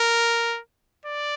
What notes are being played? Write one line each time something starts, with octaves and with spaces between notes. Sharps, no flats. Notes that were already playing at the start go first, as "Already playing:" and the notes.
Already playing: A#4
D5